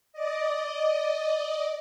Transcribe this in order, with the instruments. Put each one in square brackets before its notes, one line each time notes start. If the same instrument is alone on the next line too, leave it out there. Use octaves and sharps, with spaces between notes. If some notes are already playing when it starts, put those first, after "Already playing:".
[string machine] D5 D#5